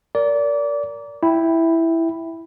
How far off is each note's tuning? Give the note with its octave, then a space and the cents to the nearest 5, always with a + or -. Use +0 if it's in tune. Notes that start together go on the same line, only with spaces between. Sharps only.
A#4 +0 D5 -25
E4 +0 G5 +0